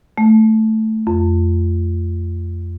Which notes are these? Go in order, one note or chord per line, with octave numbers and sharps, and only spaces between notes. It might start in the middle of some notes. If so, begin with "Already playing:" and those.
A3
F2